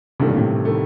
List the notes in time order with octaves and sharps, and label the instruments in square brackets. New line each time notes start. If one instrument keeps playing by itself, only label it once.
[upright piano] A1 G2 D#3 A3 [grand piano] C3
[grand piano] A#2
A2 C3
[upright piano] D#3 A3